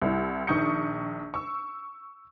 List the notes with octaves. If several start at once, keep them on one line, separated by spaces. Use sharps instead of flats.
C2 G3 E4
A#1 D#3 C#6 D#6 G6 C#7
C#6 E6